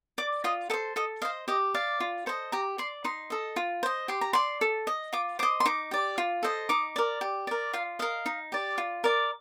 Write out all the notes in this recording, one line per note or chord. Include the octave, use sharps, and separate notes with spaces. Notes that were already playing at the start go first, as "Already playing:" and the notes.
D5 D6
F4 D#5
A4 C5 D#5
A4 D#5
C5 D#5 F5
G4 D#5
D5 F5
F4
A4 C5 D#5
G4 A#5
D5 C6
D#4 C6
A4 D#5
F4
C5 D#5
G4 C6
A#5
D5 C6
A4
D#5
F4 D6
C5 D#5 D6
C6
D#4 D6
G4 D5
F4
A4 C5 D#5
D#4 D6
A#4 D5
G4
A#4 D5
F4 F5
A#4 D#5 F5
D#4
G4 D5
F4
A#4 D5